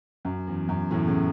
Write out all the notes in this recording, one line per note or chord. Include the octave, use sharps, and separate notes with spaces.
F#2
E2
F#2
E2 A2
A2 C#3